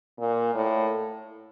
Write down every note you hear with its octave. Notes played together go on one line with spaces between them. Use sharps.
A#2
A2